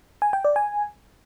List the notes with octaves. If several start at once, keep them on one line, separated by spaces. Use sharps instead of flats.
G#5
G5
D5
G#5